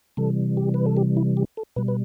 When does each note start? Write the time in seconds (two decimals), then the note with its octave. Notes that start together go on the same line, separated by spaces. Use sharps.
0.17 C3 E3 G3 A4
0.57 G4
0.74 B4
0.86 A4
0.97 G4
1.17 E4
1.37 G4
1.57 A4
1.76 B2 G3 B4
1.88 B4